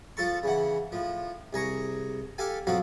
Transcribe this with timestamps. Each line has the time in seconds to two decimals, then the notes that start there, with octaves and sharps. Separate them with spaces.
0.17 F3 F4 A4 A5 C#6
0.43 C#3 E3 F#5
0.92 A2 F3
1.53 C2 G#4 A#5 C#6
2.38 G4 A4 F5 G5 G#5
2.67 B1 F3 F#3 C4 F#4 F5